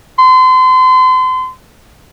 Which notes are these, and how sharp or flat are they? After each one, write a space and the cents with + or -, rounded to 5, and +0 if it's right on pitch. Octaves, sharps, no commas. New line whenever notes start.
C6 -35